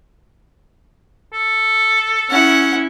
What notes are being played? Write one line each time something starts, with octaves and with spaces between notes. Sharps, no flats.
A4
C#4 E4 F#5